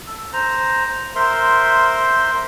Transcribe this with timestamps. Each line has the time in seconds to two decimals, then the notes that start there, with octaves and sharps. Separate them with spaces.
0.07 A4
0.33 C5 A#5
1.16 A#4 C5 E5 C6